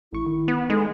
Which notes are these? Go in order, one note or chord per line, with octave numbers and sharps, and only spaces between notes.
A1 E4 C#6
D#3
B3
G#3 D#4 A4